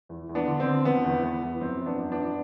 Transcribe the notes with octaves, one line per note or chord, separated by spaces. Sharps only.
E2
E2
B3 D4
D3
C4
D3
D3 B3
E2
E2 B3
E2
F#2 C4
F#2
B3 D4
F#2
B3 D4
F#2